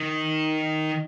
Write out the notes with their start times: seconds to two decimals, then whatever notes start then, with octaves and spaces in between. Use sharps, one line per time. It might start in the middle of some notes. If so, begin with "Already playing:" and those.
Already playing: D#3